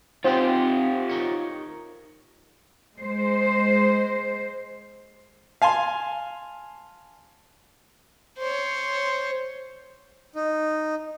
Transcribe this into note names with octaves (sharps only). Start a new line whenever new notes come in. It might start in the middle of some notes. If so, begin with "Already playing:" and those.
C4 D#4 F4 G4 C5 F#5
D#4 A#4 C#5
G#3 C5
F5 G#5 A5 C6
C5 C#5
D#4